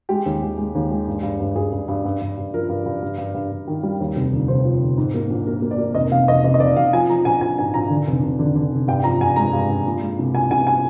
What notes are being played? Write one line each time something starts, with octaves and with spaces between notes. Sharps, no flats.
G#3 G4
D#2
G#3
G#3
D#2
G#3
G2
G2
G2
G2 G#4
G2
G2
G2
G2
G2
F3 A#4
G2
G2
G2
G2
G2
G2
D#3
G3
D#2
F1
D3
F1 C5
F3
D3
G#2
A#3
A#1
A#3 A#4
A#3
D5
A#3
F1 D#5
F1 F5
F1 D#5
F1 D#5
D#5
F1 D5
F1 F5
F3 G#5
F3 A#5
A#1 G#5
A#1 G#5
G#2 G#5
A#1 A#5
D3
F1
F1
D3
D3
F1
G2 G5
F3 A#5
G2 G#5
G#3 A#5
G2
G2
A#2
G#3
C2
A#2 G#5
C2 G#5
G#5